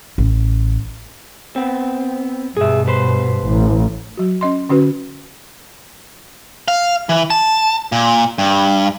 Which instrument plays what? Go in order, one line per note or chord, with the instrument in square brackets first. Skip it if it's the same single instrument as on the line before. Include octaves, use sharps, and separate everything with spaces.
[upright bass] A1
[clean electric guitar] B3 C4
[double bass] G2 B2 [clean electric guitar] G#4 E5
[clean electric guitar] B4 C5
[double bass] A1
[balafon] F#3 F#4
C#4 D#5 C6
D3 C#4 F#4 B4
[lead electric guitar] F5
E3
A5
A#2
G2